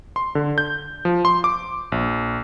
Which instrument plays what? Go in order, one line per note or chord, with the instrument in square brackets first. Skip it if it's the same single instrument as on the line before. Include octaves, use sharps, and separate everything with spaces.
[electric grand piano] C6
D3
G6
F3
C6
D6
A#1